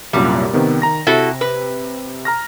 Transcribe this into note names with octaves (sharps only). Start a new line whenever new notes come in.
C2 F#2 A#2 G3
C3 D#3 B3
D#3 A#5 A#6
C3 E4 F#4 A4
B4
A#5 F6 A#6